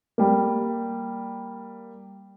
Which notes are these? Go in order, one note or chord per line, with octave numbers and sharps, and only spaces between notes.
G3 A#3